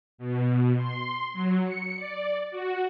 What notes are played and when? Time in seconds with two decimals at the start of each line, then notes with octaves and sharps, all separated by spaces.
0.18 B2
0.77 C6
1.33 F#3
1.64 C#7
1.96 D5
2.51 F#4